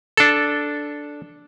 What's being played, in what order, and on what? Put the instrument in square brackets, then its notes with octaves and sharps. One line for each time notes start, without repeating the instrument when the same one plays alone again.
[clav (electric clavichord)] D4 A4